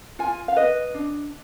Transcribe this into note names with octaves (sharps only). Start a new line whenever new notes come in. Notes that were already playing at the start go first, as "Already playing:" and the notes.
F4 G#5
F5
B4 D#5
D4